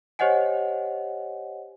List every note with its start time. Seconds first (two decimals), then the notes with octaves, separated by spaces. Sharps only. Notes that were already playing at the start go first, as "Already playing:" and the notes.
0.19 G4 C5 C#5 D#5 F#5 G#5